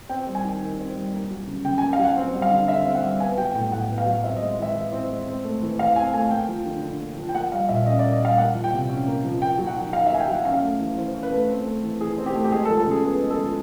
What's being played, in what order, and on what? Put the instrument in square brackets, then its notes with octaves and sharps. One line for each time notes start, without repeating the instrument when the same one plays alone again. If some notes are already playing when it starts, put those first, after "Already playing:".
[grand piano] C4 G5
G3
G#5
D#3
D#3
C4
G3
A#3
F#3
C#3
C#3 G5
G#5
A#3
F5
F#3 F#5
C4
G3
F5
D3
D3 E5
C4
F#5
G3
B3 G#5
F#3 G5
A2 G5
A2 F#5
B3
F5
F#3
C4 E5
D#5
G#3
E3 E5
E3
C4
G#3
C4
A3
E3
E3 F5
C4 G#5
A3 G#5
A#3 G5
F3
D3
D3
A#3
F3
G5
A#3 F#5
G3 F5
A#2 E5
C#4 D#5
D5
A#3
D#5
G3 F5
A#3 F#5
F3
G5
C3
C#4
A#3
F3
A#3 G5
F#3
F#5
D#3
D#3 F5
E5
A#3 G#5
G5
F#3 F#5
C#4 F5
A3
E3
E3 C5
C#4
B4
A3
C4
A3
E3
E3 G#4
C4
G4
A3
G4
G#3 G#4
A4
F3
A4
C#3 G#4
B3 G#4
G#3
A4
F3